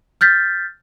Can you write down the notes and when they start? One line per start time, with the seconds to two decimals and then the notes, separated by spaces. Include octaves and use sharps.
0.21 F6 G6 A6 B6